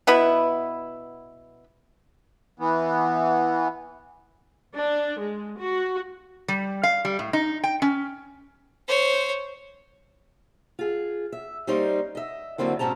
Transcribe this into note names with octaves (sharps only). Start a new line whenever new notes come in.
B2 B3 E4 B5
E3 B3
D4
G#3
F#4
G3
F5
G3
A2
D#4
G5
C#4
C5 C#5
F4 G#4
E5
G3 A#3 C#4 D#4 C5 D5
D#5 E5
F2 D3 F#3 A#3 C4 E4
G#2 B2 C4 C#4 A5 A#5